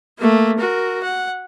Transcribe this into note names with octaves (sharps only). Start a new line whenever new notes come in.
A3 A#3
F#4 A#4
F#5